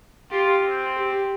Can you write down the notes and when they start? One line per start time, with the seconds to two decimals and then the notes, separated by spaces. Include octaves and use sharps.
0.31 F4 G4
0.64 C4
0.96 G4